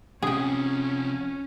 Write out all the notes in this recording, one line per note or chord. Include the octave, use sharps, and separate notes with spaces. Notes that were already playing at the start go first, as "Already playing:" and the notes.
C3 F3 C#4 G#4 G5